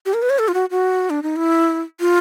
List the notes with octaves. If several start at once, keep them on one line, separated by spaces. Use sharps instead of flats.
G4
A#4
B4
C#5
A4
F4
F#4
F#4
D4
D#4
E4
F4